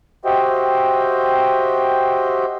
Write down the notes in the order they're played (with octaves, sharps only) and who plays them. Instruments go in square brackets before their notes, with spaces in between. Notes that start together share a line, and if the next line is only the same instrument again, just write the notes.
[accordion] F#4 G4 C5 D#5 E5 G5